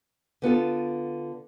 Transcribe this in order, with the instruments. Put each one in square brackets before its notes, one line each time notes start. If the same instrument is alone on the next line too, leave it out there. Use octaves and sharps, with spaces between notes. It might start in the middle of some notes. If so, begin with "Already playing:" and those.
[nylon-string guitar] D3 B3 F4 A4